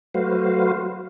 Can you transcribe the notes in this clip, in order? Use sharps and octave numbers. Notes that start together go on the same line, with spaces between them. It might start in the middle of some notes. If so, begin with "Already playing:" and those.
F#3 A3 F#4 B4 C5 F5